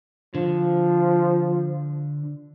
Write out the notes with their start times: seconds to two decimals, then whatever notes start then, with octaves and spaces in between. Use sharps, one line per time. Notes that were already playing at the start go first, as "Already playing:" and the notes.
0.35 D3 F3